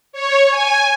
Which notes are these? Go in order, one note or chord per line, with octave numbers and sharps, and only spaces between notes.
C#5
G#5